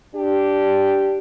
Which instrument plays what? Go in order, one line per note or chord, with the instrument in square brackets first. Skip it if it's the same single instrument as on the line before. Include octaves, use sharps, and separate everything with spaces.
[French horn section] D4 G4